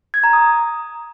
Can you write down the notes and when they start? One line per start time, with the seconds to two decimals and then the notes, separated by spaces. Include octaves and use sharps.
0.14 G#6
0.24 A#5
0.33 D#6